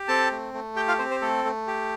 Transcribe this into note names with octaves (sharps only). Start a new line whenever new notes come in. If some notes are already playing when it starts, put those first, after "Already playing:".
Already playing: G4
C4 A4 A5
A3
A3
G4 G5
F4 F5
C4 C5
C5
A3 A4
A3
G4